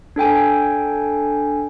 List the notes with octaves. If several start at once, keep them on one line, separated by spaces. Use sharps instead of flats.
D4 A4 G5 G#5